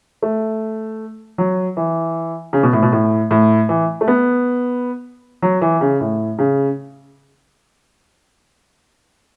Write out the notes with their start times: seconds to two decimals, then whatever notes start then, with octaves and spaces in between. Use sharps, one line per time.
0.22 A3
1.38 F#3
1.77 E3
2.53 C#3
2.63 B2
2.73 A2
2.83 B2
2.92 A2
3.31 A2
3.69 E3
4.01 A3
4.08 B3
5.42 F#3
5.61 E3
5.81 C#3
6.01 A2
6.39 C#3